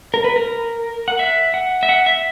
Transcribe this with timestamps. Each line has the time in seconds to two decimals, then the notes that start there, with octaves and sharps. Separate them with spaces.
0.14 A#4
0.24 B4
0.36 A#4
1.08 F#5
1.19 E5
1.54 F#5
1.83 E5
1.89 F#5
2.06 E5